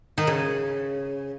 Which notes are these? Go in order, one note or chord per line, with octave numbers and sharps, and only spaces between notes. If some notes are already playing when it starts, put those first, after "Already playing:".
D#3
C#3